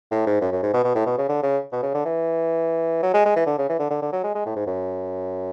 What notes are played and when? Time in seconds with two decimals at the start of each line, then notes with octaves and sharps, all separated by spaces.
0.12 A2
0.27 G#2
0.41 F#2
0.52 F#2
0.63 G#2
0.74 B2
0.84 B2
0.95 A2
1.06 B2
1.18 C#3
1.29 D3
1.43 C#3
1.72 B2
1.83 C#3
1.94 D3
2.05 E3
3.03 F#3
3.14 G#3
3.26 G#3
3.36 E3
3.46 D3
3.58 C#3
3.69 E3
3.79 D3
3.90 D3
4.02 D3
4.12 F#3
4.24 G#3
4.35 G#3
4.46 A2
4.56 G#2
4.67 F#2